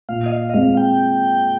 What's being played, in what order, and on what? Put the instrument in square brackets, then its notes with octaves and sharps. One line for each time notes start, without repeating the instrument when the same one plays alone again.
[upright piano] A#2 [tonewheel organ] F5
[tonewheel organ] D#5
F5
D#5
[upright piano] G#3 C4 [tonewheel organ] F5
[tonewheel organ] G5